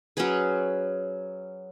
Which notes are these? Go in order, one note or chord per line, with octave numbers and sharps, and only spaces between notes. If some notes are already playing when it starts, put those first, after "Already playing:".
F#3 C#4 G#4 B4